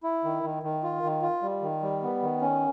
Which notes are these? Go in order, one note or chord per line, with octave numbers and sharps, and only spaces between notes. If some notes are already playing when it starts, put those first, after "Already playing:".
E4
D#3
D#3
D#3
F4
D#3
F4
G3
D#3
G3
B3
D#3
C#4